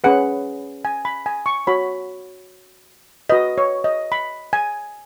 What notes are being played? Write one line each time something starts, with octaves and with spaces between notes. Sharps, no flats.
C#4 G#4 B4 F#5
G#5
B5
G#5
C#6
F#4 C#5 B5
F#4 B4 D#5
C#5
D#5
B5
G#5